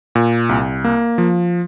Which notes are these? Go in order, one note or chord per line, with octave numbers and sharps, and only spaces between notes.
A#2
C2
A#3
F3